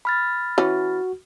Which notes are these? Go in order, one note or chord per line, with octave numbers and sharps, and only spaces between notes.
B5 F6 A6
E3 C#4 F#4